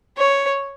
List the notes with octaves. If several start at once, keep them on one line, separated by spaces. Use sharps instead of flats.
C#5